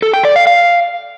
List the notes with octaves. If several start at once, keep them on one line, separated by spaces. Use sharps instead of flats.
A4
G5
D5
F5
F5